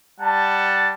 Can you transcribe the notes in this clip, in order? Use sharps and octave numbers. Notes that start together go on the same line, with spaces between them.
G3 F#5 A5